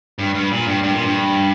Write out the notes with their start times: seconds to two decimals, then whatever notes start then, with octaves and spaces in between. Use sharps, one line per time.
0.19 G2
0.34 G2
0.51 A#2
0.67 G2
0.83 G2
0.94 A#2
1.04 G2